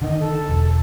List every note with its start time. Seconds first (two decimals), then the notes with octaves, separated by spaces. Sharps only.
0.02 D3 D#3 D#5
0.20 A4
0.49 E1